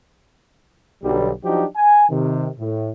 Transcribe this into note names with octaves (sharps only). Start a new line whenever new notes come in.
B1 D3 G3
F3 F#3 D4 D#4 F#4 G4
G#5
C3 D#3
A2